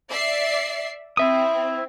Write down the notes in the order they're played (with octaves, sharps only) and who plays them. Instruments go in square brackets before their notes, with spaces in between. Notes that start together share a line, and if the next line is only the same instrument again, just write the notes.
[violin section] D5 E5 C7
[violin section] C4 [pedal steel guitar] E4 E5 D#6